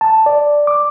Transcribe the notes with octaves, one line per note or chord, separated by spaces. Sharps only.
A5
D5
D6